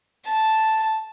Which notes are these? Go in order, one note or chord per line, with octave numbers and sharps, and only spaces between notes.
A5